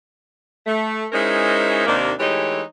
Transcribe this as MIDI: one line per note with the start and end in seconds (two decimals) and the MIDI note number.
0.66 1.06 57
1.12 1.84 56
1.12 1.84 61
1.12 1.84 63
1.12 1.84 64
1.12 1.84 70
1.12 1.84 72
1.86 2.12 39
1.86 2.12 48
1.86 2.12 58
1.86 2.12 62
1.86 2.12 63
2.19 2.61 52
2.19 2.61 56
2.19 2.61 57
2.19 2.61 63
2.19 2.61 67
2.19 2.61 73